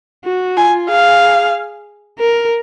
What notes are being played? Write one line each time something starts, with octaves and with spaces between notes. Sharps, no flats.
F#4
F4 G#5
G#4 F5
A#4